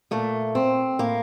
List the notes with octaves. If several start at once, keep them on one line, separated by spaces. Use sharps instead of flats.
A#2 A3
C4
A2 A#3